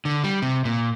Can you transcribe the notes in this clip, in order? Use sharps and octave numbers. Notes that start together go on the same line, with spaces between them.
D3
G3
C3
A#2